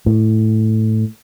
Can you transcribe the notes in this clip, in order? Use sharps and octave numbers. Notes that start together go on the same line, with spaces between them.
A2